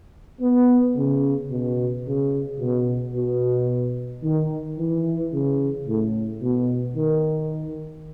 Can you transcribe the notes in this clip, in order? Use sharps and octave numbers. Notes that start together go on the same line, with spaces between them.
B3
C#3
B2
C#3
B2
B2
D#3
E3
C#3
A2
B2
D#3